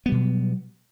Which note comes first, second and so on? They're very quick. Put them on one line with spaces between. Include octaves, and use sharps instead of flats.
B3 G3 B2 F#3